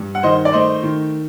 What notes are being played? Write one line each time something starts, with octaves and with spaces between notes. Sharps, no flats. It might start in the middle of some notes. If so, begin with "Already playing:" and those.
Already playing: G2
F#5
D#3 C5 D#5
D5
A3 C5 D#5
D#3